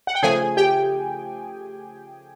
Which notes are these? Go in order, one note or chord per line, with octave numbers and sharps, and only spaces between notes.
F#5
G5
C#3 F3 A3 G#4 G#5
G4 G5